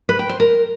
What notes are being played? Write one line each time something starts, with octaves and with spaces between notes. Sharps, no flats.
B4
G5
C5
A#4